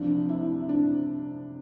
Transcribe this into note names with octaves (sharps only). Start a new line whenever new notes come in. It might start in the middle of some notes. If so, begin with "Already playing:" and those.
Already playing: C2 C3 F3 D4
E4
D4